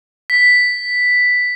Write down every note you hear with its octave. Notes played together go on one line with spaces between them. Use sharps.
B6